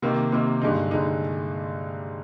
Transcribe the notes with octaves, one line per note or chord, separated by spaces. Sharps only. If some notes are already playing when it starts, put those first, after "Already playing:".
C3 D#3 A#3
C3 D#3 A#3
G2 D3 G#3 D#4
G2 D3 G#3 D#4